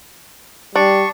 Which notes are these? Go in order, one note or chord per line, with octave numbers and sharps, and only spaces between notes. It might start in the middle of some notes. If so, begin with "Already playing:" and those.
G3 D4 C#6